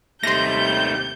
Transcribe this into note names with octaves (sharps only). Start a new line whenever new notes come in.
D#2 C3 D#3 G3 A3 C6 G6 A#6